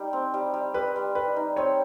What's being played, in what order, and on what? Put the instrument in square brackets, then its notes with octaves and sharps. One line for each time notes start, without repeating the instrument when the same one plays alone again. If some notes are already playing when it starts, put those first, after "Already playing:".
Already playing: [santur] G3 D#4
C4
G3
G3
[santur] G3 [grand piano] B4
[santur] G3
[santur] G3 [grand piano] B4
[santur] D#4
[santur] C4 [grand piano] C#5